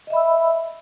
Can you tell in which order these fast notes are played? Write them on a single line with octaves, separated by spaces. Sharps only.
D#5 E5 B5 E6